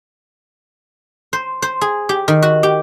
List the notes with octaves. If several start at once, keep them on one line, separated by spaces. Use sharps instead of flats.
C5
C5
G#4
G4
D#3
F#4
G4